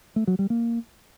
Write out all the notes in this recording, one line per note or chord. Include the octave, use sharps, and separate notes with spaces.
A3
F#3
G3
A#3